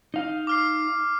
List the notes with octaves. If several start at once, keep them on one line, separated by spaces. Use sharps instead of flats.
D#4 F5
D6 F6 C7